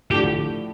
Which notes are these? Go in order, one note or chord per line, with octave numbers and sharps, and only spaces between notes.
A2 F3 A3 D4 G4